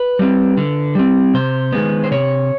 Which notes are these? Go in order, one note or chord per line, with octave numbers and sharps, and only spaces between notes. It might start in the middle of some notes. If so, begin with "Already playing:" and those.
Already playing: B4
G3 C4
D3
G3 C4
C3 C5
D#3 G#3 B3
C5
C3 C#5